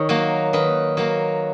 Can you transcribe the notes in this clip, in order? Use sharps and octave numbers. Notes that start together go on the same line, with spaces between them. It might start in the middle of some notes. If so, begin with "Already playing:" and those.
Already playing: D#3 C#5
F#3 A#3
D#3 B4
F#3 A#3